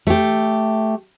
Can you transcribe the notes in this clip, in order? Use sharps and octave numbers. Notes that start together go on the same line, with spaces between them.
A3 G4